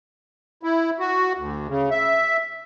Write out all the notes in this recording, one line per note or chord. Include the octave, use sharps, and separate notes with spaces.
E4
F#4
D2
C#3
E5